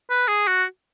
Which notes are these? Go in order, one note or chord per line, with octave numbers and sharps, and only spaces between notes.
B4
G#4
F#4